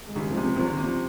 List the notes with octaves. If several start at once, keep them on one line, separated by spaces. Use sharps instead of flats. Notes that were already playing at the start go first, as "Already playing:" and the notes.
G#3
C#2 D#3 G3
F3 G#3
C3
F3 G#3
C2 F3
D#3
C3
F3